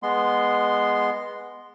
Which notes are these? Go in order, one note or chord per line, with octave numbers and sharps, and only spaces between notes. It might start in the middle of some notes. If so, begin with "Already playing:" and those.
G#3 B3 C6